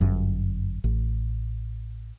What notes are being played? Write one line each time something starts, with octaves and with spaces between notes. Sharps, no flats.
G1 F#2
A1